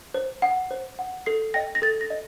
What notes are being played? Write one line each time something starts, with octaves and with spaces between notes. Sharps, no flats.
C5
F#5
C5
F#5
A4 C7
D#5 G5 A#6
A#6
A4 A6
A#6
D#5